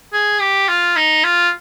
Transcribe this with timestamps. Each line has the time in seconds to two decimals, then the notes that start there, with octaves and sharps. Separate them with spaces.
0.13 G#4
0.40 G4
0.69 F4
0.96 D#4
1.24 F4